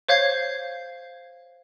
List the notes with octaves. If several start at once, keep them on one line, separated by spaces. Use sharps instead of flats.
C5 C#5 F5 G6 G#6 C7